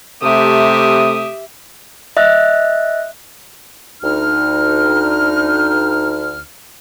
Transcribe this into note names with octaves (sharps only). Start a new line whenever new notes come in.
C3 A3 G4 E5 D#6
D#5 E5 F#6
D2 D#4 F6